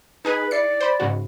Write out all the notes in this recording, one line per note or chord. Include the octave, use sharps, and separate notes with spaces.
D#4 G#4 B4 G#5
E4 D5 C7 C#7
C5 B5
G#2 C#3 F#4